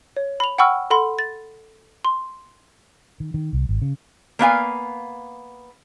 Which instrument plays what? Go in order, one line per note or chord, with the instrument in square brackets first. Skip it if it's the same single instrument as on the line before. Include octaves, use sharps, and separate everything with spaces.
[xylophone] C#5
B5 F7
F#5 G5 B5 C#6 E6 F6
A4 F#5 B5 C6
A6
C6
[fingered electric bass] D#3
D#3
C2
G#1
C#3
[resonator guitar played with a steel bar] A#3 B3 F5 G#5